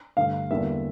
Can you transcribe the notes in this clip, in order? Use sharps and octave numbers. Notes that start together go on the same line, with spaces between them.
G2 D3 A3 F5
E2 D3 G3 A#3 E5